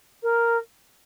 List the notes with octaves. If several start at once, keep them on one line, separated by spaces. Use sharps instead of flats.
A#4